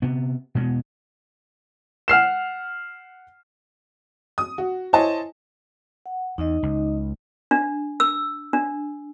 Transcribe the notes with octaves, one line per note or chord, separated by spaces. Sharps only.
C3 B3
B2 G#3 B3
F#5 F6 C7 E7
D#6
F#4
E4 C5 C#5 D#5 G#5 A5
F#5
E2 D#4 D#5
C#2
D4
E6
D4